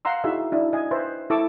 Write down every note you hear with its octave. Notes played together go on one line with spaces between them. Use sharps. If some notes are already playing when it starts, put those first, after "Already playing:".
F5 F#5 A#5 C6 E6
D#4 E4 F#4 G#4 E5
D4 E4
D#5 G#5
B4 C5 E5
E4 A4 A5 C#6 D6 E6